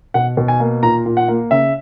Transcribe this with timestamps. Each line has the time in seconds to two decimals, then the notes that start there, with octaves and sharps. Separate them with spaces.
0.14 B2 F#5
0.37 B2
0.48 G#5
0.60 A#3
0.83 A#2 A#5
1.06 A#2
1.17 F#5
1.28 A#3
1.51 C#3 E5